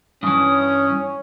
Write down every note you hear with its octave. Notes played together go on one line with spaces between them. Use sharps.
G2 E3 C#4 C#5 D#6